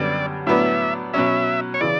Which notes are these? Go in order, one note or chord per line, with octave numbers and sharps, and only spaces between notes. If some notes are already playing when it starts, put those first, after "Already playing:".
Already playing: F#2 D3 G3 B3 D5
A2 F#3 B3 D4 E5
B2 F#3 C#4 E5
C#5
C#3 E3 D5